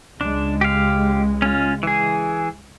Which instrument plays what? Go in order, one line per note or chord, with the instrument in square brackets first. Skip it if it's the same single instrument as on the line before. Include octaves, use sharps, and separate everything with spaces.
[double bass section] C#2 G#3 [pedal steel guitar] D4
[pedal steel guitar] G4 F5
C#4 F4
E3 G#4